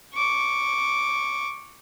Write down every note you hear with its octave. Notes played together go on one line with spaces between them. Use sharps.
C#6 D6